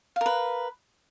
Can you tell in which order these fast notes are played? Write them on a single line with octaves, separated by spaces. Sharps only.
F5 A#4 B4